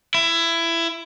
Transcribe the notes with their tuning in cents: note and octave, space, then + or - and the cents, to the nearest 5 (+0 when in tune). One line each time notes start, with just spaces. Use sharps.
E4 +20